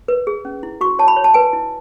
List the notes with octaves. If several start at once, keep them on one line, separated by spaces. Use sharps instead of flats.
B4
G#4
C#4
E4
F#4 C#6
C#5 A5
B5
C#5
A5
B4 G#5
E4